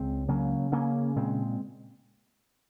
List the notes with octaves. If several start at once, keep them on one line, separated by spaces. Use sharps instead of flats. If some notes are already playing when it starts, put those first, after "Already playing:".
Already playing: C#2 G#3 C4
C#3 F#3 A#3
C#3 A#3 C#4
A#2 G#3 C4